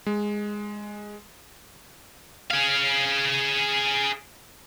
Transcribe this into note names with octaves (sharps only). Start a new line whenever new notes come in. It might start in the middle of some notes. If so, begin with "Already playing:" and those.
G#3
G#4 F5